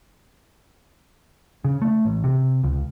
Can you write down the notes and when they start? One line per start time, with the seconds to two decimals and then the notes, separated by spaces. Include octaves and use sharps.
1.64 C#3
1.82 A3
2.05 A1
2.24 C3
2.64 C#2